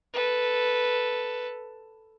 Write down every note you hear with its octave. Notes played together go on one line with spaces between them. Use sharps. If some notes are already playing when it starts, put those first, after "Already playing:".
A4 B4